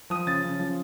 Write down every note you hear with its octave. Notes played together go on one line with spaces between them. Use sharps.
F3 D#6
C#3 A6
C#3
F3